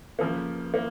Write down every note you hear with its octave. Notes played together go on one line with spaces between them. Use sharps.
C#3 F3 A#3
A#3